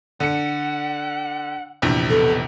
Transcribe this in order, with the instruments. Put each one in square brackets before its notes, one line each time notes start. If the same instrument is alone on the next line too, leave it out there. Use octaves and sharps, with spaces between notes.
[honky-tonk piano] D3 C#7 [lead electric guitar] F#5
[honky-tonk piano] A#1 E2 C3
[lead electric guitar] B2 B3 [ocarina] A4